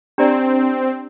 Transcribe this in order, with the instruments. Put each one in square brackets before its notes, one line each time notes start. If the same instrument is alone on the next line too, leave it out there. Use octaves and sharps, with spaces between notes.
[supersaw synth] C4 [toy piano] D4 G4 D5 G5 A#5